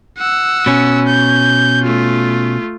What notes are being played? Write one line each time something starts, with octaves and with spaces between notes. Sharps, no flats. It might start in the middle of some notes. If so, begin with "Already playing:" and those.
F#5 E6
B2 C#4
G6
A3 F4